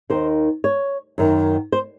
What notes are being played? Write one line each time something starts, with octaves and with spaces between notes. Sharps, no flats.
D#2 D#3 C5
C#5
F#2 D#3
C5